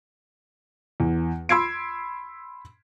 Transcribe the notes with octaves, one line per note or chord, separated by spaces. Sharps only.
E2
B5 C6 E6 G#6 C7 D7